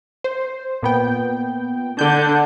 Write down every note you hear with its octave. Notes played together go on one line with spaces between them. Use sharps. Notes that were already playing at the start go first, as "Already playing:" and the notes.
C5
A#2 B3 G5
D3 D5 G6